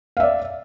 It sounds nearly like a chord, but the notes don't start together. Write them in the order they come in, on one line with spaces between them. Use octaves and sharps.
F5 E5 D5